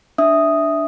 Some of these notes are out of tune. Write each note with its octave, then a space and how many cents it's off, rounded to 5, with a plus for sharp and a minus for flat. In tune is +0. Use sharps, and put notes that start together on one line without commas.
D4 +0 E5 -10 D#6 +0